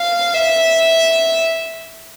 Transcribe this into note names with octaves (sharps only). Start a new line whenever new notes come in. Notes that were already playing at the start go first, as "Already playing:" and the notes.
Already playing: F5
E5